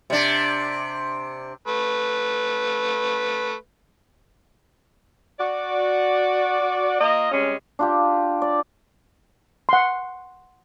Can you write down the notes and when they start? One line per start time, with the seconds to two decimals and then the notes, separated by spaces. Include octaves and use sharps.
0.10 C3 D4
1.68 A3 B4
5.40 F#4 D5
7.01 A#3 F4 D#5
7.32 C3 G3 G#3 C#4
7.79 D4 F4 G4
8.42 D5
9.69 F#5 C6